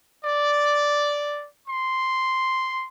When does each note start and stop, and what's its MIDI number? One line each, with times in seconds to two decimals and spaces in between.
0.24 1.47 74
1.67 2.88 84